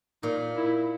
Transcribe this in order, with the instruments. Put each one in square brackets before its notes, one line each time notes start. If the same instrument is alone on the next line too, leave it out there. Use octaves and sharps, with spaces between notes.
[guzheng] A#2 [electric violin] D#4
[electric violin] E4